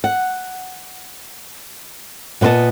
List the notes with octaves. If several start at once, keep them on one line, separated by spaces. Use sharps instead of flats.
F#5
A#2 B3 B4 D#5 A5